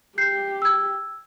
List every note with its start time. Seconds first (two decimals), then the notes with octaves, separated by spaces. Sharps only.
0.18 G4 G6 C7
0.62 E6 G#6